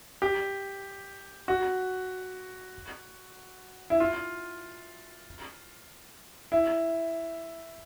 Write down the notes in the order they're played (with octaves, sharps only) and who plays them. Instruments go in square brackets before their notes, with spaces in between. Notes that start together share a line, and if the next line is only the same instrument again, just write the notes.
[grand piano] G4
F#4
E4
F4
E4